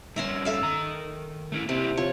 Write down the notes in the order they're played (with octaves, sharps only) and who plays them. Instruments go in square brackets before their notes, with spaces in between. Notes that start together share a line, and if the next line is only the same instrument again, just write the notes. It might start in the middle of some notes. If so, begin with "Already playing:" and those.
[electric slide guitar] G2 C#4 [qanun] E5 A#5 C6
[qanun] A4 E5 F5
[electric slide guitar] D#3 A#5
A3 C#4 E4
[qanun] C3 [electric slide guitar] A#3 C4 E4
[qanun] F3 [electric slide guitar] C#5